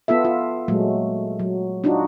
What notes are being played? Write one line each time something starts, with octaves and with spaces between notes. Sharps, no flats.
B3 F4 A4 E5
F4
A#2 F#3 G#3 A3
F#3
D4 D#4 F4 F#4